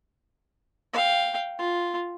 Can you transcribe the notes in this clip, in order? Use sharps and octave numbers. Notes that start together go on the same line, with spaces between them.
F5 G5
F4